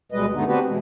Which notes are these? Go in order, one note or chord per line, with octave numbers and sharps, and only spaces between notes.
D2 B2 G3 G#3 B4 D#5
G2 D3 G#3 A3 B3 D#4
B3 C4 D4 F#4 G4 B4
B2 E3 G#3